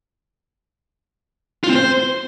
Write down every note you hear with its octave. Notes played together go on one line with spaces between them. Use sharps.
F4
C4
C5